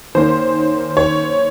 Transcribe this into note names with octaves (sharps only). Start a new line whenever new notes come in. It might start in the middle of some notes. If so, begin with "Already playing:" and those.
D#3 A#3 C#4 C5
C#5